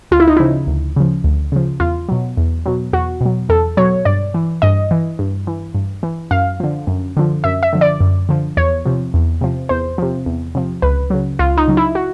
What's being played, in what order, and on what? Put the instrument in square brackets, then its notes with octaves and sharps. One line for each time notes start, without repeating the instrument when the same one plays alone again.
[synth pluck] D2 F4
E4
D#4
C#3 F3 E4
D2
C#3 F3
D2
C#3 F3
E2 F4
B2 F#3
E2
B2 F#3
E2 F#4
B2 F#3
E2 A4
B2 F#3 C#5
G2 D5
E3
G2 D#5
E3
G2
E3
G2
E3
F#2 F5
D3 F3
F#2
D3 F3
F#2 E5
E5
D3 F3
D5
F#2
D3 F3
E2 C#5
C3 F3
E2
C3 F3
E2 C5
C3 F3
E2
C3 F3
C#2 B4
C#3 F#3
C#2 F4
D#4
C#3 F#3
E4
F#4